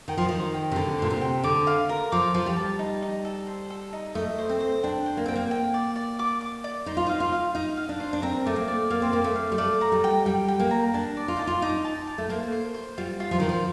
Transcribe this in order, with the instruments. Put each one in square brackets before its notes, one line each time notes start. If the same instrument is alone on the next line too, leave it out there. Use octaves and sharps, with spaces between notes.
[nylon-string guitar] D#3 [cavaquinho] G5
[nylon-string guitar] F3
[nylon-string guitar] D#3 [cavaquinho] C5
[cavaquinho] G5
[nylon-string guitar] C3
[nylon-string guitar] D3 [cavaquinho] A4
[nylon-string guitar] A#2 [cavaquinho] C5
[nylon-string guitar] C3
[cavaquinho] G5
[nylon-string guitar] D3 [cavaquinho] D6
[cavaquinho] F5
A#4
[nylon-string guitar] F3 [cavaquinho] D6
[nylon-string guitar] F3 [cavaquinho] A5
[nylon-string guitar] G3
[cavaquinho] A5
D#4
D#4
A4
C5
A4
D#4
[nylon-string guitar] A3 [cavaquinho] D#5
[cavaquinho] C5
[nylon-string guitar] C4
[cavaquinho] C5
[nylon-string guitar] D4 [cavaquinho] G5
[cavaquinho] C5
[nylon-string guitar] A#3
[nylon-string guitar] C4 [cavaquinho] G5
[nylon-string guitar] A#3
[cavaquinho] G5
D5
D5
D6
D6
D5
[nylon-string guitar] D#4 [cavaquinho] C5
[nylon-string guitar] F4
[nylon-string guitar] D#4 [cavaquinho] F5
[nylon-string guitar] F4
[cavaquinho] F5
[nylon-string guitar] D#4 [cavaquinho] F5
[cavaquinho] F5
[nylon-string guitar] D4
[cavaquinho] C5
[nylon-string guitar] D4
[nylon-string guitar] C4 [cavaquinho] A#4
[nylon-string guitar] A3 [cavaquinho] D5
[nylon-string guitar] A#3
[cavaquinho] D5
[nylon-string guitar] A#3 [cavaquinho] F5
[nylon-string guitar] C4
[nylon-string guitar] A#3 [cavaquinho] D5
[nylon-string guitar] A3
[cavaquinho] F5
[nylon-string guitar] G3
[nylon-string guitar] A3 [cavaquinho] D5
[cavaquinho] A#5
[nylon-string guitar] G3
[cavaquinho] G5
[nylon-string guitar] G3 [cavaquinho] G5
[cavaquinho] G5
[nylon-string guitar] A#3
[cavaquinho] A#5
[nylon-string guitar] D4 [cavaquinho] A5
[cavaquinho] D5
[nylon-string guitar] F4
[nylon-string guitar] D#4 [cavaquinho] A5
[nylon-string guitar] F4
[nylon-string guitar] D#4 [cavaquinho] D6
[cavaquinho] A5
A5
[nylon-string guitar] A3
[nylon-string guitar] A#3 [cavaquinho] C5
[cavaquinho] C5
C5
[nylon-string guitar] G3 [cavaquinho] F4
[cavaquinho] F4
[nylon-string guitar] F3
[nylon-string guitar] D#3 [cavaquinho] C5
[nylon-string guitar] F3